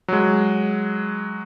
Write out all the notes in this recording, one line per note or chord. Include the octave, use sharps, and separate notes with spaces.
F#3 G#3